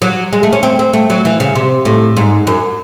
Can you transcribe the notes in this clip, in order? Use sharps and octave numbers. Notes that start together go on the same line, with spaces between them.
F#3
G#3
A3
C#4
C4
C4
A3
F#3
E3
C#3
C3
A2
G#2
F#2